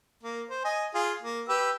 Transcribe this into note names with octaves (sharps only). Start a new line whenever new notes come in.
A#3
C5
D#5 G#5
F4 G#4
A#3
G4 B4 E6